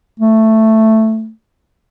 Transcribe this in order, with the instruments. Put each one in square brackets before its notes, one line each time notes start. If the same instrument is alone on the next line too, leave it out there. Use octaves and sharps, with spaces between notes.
[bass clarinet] A3